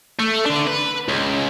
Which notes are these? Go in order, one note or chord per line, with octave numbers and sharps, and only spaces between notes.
A3
D3 D4
B4
C#2